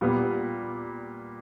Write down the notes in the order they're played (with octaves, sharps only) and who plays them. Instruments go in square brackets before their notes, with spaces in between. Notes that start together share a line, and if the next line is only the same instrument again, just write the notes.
[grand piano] A#2 G3 B3